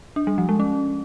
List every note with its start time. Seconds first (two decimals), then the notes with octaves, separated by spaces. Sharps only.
0.16 D4
0.27 G3
0.38 F3
0.49 G#3
0.60 C#4